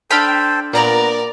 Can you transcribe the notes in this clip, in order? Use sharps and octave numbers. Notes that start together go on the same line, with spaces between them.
D4 A4 C5 F5 G5 B5
A#2 B3 A#4 D5 A#5